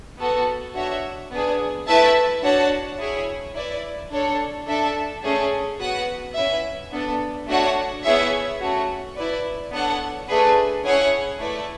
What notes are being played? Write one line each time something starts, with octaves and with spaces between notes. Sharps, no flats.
B3 F#4 A4
D4 F#4 C#5 E5
B3 D4 G#4
A3 E4 B4 E5 A5
D4 F#4 C#5 F#5 A5
E4 G#4 C#5
E4 B4 D5
D4 A4 C#5
D4 A4 E5
A3 C#4 G#4
B3 F#4 B4 F#5
C#4 E4 B4 E5
B3 D4 A4
A3 D4 F#4 C#5 F#5
B3 E4 G#4 C#5 E5
A3 C#4 F#4
E4 B4 D5
B3 D4 A4 C#5 F#5
A3 D4 G#4 B4
C#4 E4 G#4 C#5 F#5
A3 E4 B4 D5